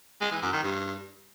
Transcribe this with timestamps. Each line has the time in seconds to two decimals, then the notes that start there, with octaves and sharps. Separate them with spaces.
0.21 G#3
0.31 E3
0.42 F#2
0.53 D#3
0.63 G2